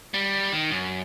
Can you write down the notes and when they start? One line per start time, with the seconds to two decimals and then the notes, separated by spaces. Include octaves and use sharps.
0.14 G3
0.52 D#3
0.71 F#2